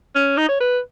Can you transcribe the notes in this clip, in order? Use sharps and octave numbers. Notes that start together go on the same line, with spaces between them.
C#4
D#4
C#5
B4